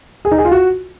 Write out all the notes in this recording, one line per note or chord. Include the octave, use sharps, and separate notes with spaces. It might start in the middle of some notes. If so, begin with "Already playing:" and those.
G#4
D#4
G#4
F4
F#4